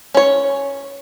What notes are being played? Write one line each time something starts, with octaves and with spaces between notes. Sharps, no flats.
C#4 C#5